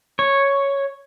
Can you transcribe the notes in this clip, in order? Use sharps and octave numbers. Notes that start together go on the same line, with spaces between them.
C#5